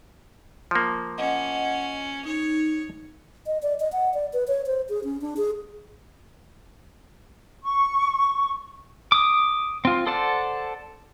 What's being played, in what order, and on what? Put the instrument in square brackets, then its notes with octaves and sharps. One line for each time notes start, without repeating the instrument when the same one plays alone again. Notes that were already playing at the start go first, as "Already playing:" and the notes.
[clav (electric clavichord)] F3 A#3
[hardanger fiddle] C#4 [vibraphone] D#5 F#5
[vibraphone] D#4 [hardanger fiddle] C#5
[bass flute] D#5
D5
D#5
F#5
D5
B4
C#5
C5
G#4
C#4
D4
G#4
[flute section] C#6
[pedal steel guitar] D6 D#6
C4 F4
A4 C5 D5 F#5 A5